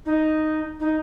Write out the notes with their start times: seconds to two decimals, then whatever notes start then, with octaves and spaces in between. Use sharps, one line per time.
0.05 D#4
0.79 D#4